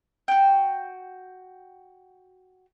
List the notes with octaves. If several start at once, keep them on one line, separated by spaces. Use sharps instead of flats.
F#4 G5